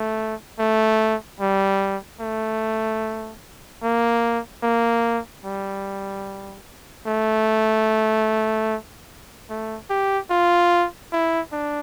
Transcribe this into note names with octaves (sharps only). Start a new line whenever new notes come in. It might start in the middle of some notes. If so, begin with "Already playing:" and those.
Already playing: A3
A3
G3
A3
A#3
A#3
G3
A3
A3
G4
F4
E4
D4